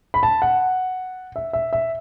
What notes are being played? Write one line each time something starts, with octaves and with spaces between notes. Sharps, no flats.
B5
A5
F#5
E5
E5
E5